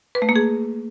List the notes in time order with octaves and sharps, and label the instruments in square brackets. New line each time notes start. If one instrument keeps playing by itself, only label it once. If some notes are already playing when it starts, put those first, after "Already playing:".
[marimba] B4
A3
A#3
G#4